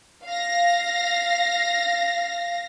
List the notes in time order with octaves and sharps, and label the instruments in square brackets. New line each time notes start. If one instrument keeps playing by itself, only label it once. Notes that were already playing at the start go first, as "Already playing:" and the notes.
[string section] F5 A#6